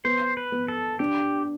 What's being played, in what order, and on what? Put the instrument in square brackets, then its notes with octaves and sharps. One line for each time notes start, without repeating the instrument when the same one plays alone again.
[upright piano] B3 [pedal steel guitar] C5
[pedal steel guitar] B4
[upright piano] B3
[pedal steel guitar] A4
[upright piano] D4 [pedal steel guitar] G4